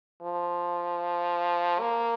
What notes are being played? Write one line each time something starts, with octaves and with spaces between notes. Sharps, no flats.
F3
A#3